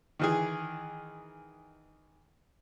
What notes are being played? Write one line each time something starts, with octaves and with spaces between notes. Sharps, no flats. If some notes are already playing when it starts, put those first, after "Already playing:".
D#3 E3 G#4